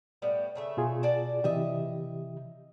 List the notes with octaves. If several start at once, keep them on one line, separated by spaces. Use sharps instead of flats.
A2 G3 B3
C#3 A3 E5
B2 F4 G#4
F#4 D5 A5
C3 E3 G4 D#5 E5